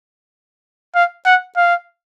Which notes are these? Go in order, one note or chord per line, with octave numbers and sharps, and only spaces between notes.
F5
F#5
F5